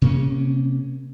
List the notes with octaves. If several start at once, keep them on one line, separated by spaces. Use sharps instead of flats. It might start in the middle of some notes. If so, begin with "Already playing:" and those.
C3 A#3 C#4